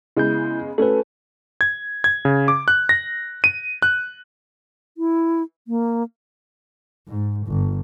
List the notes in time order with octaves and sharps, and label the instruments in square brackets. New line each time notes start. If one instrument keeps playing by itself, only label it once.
[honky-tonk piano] C#3 G#3 B3 [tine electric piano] E4 G6
[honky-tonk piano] A3 C#4 F#4 [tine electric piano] A4 B4
[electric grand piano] G#6
G#6
C#3
D6
F#6
A#6
D#7
F#6
[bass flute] E4
A#3
[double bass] G#2
G1